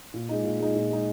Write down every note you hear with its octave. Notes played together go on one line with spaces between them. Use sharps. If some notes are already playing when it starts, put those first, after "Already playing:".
A#2
G#3 D#4
A#2
G#3 D#4
A#2
G#3 D#4